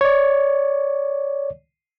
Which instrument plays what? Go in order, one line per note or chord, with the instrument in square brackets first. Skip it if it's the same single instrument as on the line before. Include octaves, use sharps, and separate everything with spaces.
[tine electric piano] C#5 D5